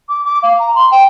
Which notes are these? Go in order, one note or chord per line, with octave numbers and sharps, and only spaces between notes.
D6
D6
F5
A#5
C6
G5